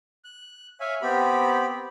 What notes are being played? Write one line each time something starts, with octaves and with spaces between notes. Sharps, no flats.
F#6
C#5 E5 F5 G#5
B3 C4 G4 B5